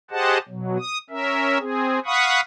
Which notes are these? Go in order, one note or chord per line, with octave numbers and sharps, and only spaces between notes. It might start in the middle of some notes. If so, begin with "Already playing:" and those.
G4 G#4 C5 D#5 F#5 A5
B2 F#3
D#6
C#4 A#4 E5
C4 G#4
F5 F#5 B5 C#6 D#6